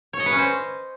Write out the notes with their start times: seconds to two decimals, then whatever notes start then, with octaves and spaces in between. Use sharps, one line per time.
0.13 C#5
0.20 D#5
0.26 B4
0.32 C#4
0.39 C5